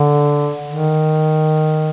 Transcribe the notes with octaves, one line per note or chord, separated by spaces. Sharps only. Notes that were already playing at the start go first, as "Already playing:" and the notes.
Already playing: D3
D#3